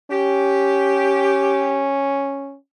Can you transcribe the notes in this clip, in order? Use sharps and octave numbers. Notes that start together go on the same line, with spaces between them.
C#4 G4